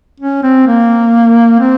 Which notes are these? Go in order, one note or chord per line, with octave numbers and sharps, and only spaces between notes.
C#4
C4
A#3
C4